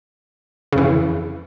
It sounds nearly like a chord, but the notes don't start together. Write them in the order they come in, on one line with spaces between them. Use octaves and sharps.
C#3 F2 E3